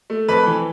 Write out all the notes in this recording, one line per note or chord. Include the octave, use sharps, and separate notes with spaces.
A3
F2 B4
E3